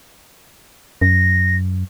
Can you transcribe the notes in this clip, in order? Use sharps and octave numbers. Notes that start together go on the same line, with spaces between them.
F#2 A#6